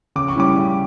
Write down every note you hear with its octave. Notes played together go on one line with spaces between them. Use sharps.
C#3 D6
C#6
G3 C#4 E4 D6
C#3